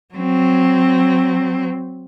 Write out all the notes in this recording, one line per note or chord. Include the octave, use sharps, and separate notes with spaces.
F#3 C4